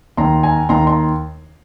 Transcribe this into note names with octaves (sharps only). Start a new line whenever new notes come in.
D#2 D#3 A#5 C6
G#5 A#5
D#2 D#3 A#5 C6
A#5 C6